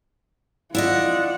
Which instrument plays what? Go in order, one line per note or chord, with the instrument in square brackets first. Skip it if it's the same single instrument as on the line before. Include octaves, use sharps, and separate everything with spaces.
[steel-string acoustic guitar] E4 D5 D#5 [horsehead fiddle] F4 F#5